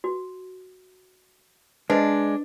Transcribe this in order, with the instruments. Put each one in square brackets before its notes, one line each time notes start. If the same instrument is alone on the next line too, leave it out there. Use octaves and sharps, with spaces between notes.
[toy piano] F#4
[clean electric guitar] G#3 [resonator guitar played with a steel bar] D4 [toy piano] B4 C5 D#5